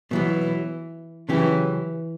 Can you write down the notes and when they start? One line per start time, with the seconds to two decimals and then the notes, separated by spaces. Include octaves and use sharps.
0.11 B2 E3 F#3 B3
1.29 C#3 E3 F#3 C#4 G4